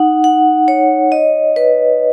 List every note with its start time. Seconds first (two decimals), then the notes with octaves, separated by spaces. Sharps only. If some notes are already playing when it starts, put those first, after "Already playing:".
Already playing: D#4 F#5
0.24 F#5
0.68 C#5
1.12 D#5
1.56 B4